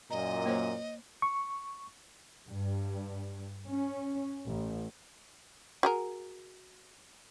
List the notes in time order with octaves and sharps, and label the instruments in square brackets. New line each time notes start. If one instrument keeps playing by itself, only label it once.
[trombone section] F#2 A#2 [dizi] D#5 [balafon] A#5
[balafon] A#3 C5 C#5
[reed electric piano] C#6
[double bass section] G2
C#4
A1
[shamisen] F#4 G#4 A#4